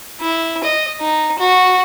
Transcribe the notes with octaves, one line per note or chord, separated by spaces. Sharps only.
E4
D#5
D#4
F#4